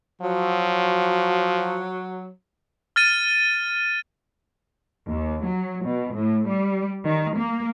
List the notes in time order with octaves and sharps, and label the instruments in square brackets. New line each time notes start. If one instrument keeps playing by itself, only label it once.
[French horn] F3 [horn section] F#3
[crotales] F6 A6 D#7
[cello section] D#2
F#3
B2
A2
G3
D#3
A#3